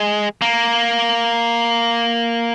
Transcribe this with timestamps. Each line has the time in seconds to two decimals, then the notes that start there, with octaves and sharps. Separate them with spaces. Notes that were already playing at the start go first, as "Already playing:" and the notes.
Already playing: G#3
0.42 A#3